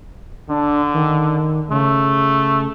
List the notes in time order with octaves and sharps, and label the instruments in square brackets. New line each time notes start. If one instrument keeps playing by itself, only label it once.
[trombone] D3 [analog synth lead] D4
[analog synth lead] D#3
[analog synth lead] C#3 [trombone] A3